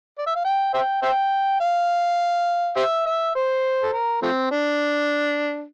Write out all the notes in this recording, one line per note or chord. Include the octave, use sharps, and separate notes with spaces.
D5
E5
F5
G5
C5 E5 G5
C5 E5 G5
F5
G4 C5 E5
E5
C5
A4
A#4
F3 A3 C4
D4